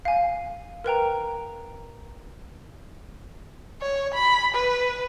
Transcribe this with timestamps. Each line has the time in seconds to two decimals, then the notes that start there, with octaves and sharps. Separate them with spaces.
0.05 F5 G#5
0.84 A#4 B4 G5 A#5
3.82 C#5
4.14 B5
4.55 B4